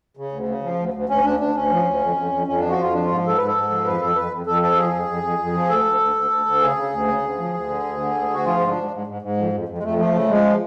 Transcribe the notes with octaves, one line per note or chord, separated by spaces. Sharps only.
C#3
D2
C#3
F3
D2
D2
D2 C#4
D2 D4
D2 D4
D2 C#4
F3
D2
F2
F2
F2
F2 C#4
F3 D4
F#4
F2 F4
F3 D4
G#2 F4
G#2 A4
G#2 B4
A4
G#2
F3
F2 B4
F2 A4
F2 B4
F2
F2 A4
F3 A4
F2 G#4
F2
F2
F2
F2
F3
D2 A4
D2
D2
D2
D2
D2
C#3 G#4
C#3
D2
C#3
D2
F3
D2
D3
D2
D3
D2
D2 F#4
F3 F4
G#2
D4
G#2
G#2
G#2
G#2
F2
F2
F2
G#3
F2 A3
F3 A3
C#3 A3
F3 G#3